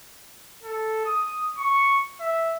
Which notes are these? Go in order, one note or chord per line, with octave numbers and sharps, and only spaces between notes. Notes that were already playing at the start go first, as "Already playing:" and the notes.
A4
D#6
C#6
E5